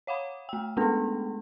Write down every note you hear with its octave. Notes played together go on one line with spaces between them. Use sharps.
C#5 F5 F#5 B5
A3 G5
G#3 A3 B3 C#4 D4 A4